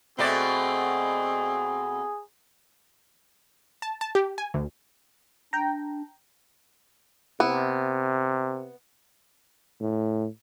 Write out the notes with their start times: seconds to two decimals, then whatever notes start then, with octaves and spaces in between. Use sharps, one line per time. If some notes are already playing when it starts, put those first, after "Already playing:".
0.19 B2 A3 C4 G#4 D5
3.82 A5
4.01 A5
4.15 G4
4.38 G#5
4.54 D2
5.53 D4 G5 A#5
7.40 C3 B3 E4
9.80 A2